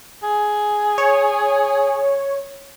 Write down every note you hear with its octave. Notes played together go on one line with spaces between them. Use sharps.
G#4
C#5